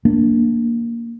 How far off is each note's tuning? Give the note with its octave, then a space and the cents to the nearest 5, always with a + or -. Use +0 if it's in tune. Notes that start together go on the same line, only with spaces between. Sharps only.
A#3 +0 D4 +0